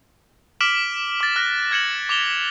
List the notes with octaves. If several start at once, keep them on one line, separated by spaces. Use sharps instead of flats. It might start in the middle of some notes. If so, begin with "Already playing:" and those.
D6 F6 B6 D7 E7 F#7
D6 A6
F6 F#6 A#6
F6 G#6 C#7 E7 F#7
D6 F7 G7